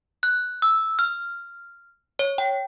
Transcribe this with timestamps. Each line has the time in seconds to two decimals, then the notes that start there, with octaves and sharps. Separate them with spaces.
0.23 F#6
0.62 E6
0.99 F6
2.19 C#5
2.38 G5